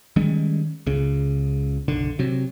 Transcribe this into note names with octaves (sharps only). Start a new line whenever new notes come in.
D#3 G3 G#3 C#4
C#2 C#3
F#1 B1 D3
C3 F#3